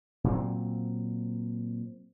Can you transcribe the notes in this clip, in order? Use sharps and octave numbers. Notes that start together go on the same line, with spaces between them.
A#2 F#3 C4